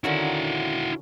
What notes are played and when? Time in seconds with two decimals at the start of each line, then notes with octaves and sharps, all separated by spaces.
0.04 D3 D#3 C#4 E4 F#4